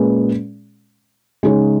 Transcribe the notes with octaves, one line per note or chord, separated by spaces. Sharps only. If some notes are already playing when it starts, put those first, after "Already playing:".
Already playing: A#2 G#3 C#4 G#4 B4
C#3 G#3 D#4 G#4 C#5